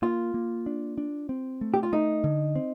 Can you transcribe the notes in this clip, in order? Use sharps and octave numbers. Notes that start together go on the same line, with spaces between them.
A#3 F4
A#3
D4
D4
C4
A3
G4
F4
A3 D#4
D3
C4